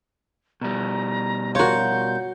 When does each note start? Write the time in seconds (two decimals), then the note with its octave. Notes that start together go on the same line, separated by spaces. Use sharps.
0.61 B2 G3 A#5
1.55 F4 F#4 A#4 C#5 G6